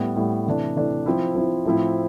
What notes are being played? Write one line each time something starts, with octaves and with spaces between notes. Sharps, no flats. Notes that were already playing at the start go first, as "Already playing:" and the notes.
Already playing: A2 G3 B3
A2 G3 B3
C3 E3 A3 D4
C3 E3 A3 D4
F3 C4 E4
F3 C4 E4
A2 F3 C4 E4